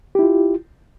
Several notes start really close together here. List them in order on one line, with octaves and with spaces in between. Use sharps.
G4 E4 F4